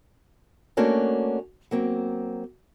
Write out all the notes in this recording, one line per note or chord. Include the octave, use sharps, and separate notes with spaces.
A3 A#3 C#4 D4 F#4
F#3 A#3 C4